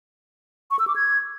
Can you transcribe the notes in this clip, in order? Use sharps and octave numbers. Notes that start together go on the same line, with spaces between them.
C#6
E6
D6
G#6